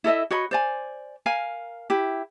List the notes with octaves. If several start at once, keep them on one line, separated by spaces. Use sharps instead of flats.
E4 A4 D#5 E5
F#4 C#5 D#5 B5
C5 D5 G#5
A#4 F5 G#5
E4 G4